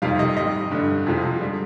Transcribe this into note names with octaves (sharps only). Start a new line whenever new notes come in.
F2 C3 D#3 G3 F5
D#5
G#2 G3 D#5
G2 D3 G3
F2 C3 F3 G#3
D3 G3